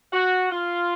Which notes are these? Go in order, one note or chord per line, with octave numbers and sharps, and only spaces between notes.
F#4
F4